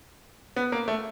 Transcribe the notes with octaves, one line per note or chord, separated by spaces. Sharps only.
B3
A#3
A3